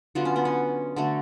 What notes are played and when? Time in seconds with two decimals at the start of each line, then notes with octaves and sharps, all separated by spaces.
0.15 D3 F#3 B3 F4
0.25 C#4
0.36 B3
0.45 C#4
0.96 D3 F#3 A3